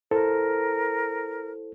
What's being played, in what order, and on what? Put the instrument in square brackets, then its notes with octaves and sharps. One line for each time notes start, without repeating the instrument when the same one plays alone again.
[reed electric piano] E4 A4 C5 [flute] A#4